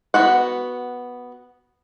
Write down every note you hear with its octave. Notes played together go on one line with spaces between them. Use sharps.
B3 F#4 F#5